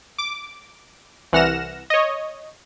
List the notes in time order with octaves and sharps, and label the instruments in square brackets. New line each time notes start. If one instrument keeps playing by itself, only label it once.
[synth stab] D6
C2 E3 F#5 F6 A#6 E7
C#5 D#5